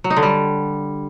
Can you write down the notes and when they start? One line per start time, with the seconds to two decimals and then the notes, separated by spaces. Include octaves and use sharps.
0.04 F#3
0.10 D#4
0.17 D3
0.23 G3